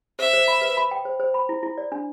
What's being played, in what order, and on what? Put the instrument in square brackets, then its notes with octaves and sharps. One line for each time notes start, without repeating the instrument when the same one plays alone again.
[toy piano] C5 [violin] E5
[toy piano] C5
B5
B4
B5
G5
C5
C5
B5
E4
E4
D5
D4